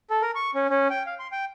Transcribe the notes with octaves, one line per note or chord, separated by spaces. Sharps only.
A4
A#4
C#6
C#4
C#4
G5
F5
C6
G5